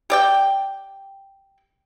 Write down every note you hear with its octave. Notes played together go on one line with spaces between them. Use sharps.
G4 D5 G5